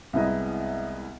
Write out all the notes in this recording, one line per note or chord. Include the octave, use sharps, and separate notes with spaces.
C2 G#3 B3 E4 D#5 A#5